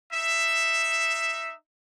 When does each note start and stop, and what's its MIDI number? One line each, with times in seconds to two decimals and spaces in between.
0.13 1.53 63
0.13 1.53 76